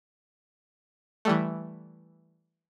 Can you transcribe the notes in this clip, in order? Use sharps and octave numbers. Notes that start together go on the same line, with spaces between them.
E3 G3 A3